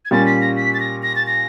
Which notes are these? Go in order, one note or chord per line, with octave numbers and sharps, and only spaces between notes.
G#6
A#2 G3 A#3 C#4 F4 A6
B6
A#6
B6
A6
A#6
A#6
A6
A#6